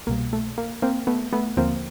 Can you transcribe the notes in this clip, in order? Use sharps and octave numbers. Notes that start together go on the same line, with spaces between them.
C2 B2 G3 A#3
A3
A#3
A#3 C4
A3 B3
A3 B3
D#2 D3 F3 A#3 C4